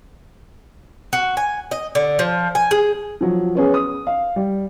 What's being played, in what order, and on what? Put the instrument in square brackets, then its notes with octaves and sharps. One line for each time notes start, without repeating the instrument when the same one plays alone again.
[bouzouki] F#4
G#5
D#5
D3
F3
G#5
G#4
[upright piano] F3 F#3
B3 C#4 G#4
D#6
F5
G3